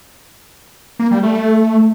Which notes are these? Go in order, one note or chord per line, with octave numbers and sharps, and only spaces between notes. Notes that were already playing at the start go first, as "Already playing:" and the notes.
A#3
G3
A3